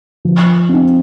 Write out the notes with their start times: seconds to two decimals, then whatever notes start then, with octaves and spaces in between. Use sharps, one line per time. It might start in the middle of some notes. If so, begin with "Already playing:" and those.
0.25 F3
0.69 C4 D#4